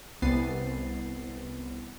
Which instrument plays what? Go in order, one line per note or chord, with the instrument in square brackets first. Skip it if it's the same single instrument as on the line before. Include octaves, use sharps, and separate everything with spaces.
[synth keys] C2 B3 A6 C7 D#7